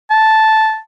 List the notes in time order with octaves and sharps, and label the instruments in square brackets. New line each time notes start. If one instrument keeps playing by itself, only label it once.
[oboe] A5